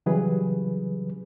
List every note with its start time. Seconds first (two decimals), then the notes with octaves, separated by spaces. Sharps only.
0.06 C#3 E3 F#3 G3 G#4 B4